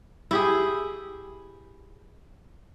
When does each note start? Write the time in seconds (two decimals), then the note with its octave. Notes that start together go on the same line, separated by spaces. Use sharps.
0.31 E4 G4 G#4